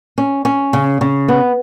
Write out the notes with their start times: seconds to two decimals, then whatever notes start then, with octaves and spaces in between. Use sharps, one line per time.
0.18 C#4
0.45 C#4
0.73 C#3
1.01 C#3
1.28 B3